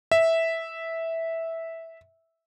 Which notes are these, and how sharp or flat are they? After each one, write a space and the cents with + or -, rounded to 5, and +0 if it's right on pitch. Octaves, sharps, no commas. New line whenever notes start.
E5 -10